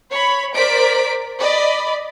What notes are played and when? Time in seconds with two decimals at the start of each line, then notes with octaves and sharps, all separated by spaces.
0.11 C#5 B5
0.54 A#4 C5 D5 B6 D7
1.40 D5 D#5 B5